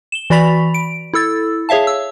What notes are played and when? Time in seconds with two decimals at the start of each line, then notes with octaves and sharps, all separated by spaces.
0.12 E7 G7
0.30 E3 F#4 D5 B5 B6 F7
0.74 D7
1.14 E4 A4 E6 A6
1.69 G#4 C#5 E5 F5 A5
1.87 E6